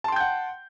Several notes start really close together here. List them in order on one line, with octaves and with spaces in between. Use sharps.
A5 C6 G5 G6 F#5